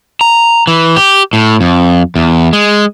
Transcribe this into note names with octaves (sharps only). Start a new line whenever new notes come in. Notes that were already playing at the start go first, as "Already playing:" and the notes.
A#5
E3
G4
A2
F2
E2
G#3